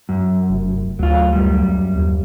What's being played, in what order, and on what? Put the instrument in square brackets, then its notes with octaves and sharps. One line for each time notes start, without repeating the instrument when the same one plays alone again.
[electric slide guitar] F#2
[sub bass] F1
[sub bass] D2 [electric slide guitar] F#3 F4
[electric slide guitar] F#2 G3
[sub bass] D#2